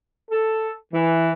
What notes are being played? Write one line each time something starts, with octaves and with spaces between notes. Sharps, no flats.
A4
E3